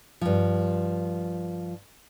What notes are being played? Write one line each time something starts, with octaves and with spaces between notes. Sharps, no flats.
G2 F3